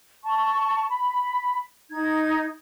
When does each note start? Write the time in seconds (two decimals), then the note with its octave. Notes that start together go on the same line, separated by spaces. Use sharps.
0.24 A5 C#6
0.89 B5
1.91 D#4 G#6